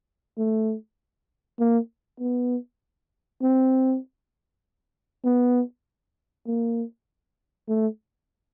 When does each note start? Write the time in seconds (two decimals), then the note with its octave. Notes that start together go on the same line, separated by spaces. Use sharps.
0.38 A3
1.60 A#3
2.20 B3
3.43 C4
5.25 B3
6.47 A#3
7.69 A3